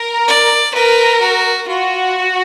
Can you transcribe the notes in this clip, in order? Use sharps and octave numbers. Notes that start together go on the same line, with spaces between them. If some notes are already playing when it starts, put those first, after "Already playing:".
Already playing: A#4
D5
A#4 B4
F#4
F4 F#4